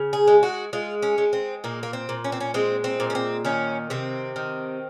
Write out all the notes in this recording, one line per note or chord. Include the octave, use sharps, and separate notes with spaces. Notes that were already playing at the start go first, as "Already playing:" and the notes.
Already playing: C#3
G#4
G#3
F#4
G#3 F4
C#4
G#3
C4
A#2 A#3
A#3
C4
A#2
C#4
C4
C#4
G#3 C4
C4
A#2
C#4
C4
D#3 C#4
C3 C4
D#3